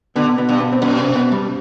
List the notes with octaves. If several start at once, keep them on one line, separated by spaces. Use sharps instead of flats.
B2 D3 B3
B2 B3
G2
B2 B3
C4
F#2 B2 B3
C3 C4
B2 B3
G2 G3